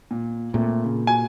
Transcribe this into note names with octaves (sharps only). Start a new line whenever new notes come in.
A#2
A#2 A3 C4
C#3
F#4 G#5